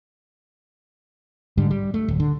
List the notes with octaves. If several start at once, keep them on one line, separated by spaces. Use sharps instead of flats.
G#2 D3 G3
G3
A3
D1
D3